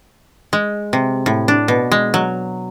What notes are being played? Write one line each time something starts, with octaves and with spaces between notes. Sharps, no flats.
G#3
C3
A2
D4
B2
G#3
F#3